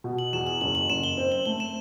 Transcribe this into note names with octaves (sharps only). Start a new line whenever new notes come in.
B2
F#7
E2 E7
F#7
F#1 F#7
F#7
F#1 E7
G7
C4
F#7
A3 G7
E7